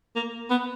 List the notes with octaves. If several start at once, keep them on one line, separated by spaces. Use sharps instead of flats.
A#3
B3